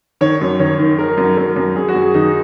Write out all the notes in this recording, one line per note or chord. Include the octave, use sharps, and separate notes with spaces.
D#3 C#5
F#2
D#3 C#5
D#3
D#3 A#4
F#2
F#2 A#4
F#2
F#2 G#4
F#4
F#2
G#4
D#3 D#4